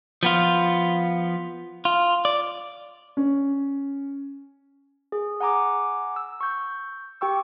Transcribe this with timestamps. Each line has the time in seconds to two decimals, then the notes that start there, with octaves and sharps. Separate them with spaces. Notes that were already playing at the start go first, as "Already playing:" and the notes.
0.23 F3 B3 F4
1.85 F4
2.25 D5
3.17 C#4
5.12 G#4
5.41 F#5 G#5 A#5 D6
6.16 E6
6.41 C#6 G6
7.21 G4 G5 C#6 E6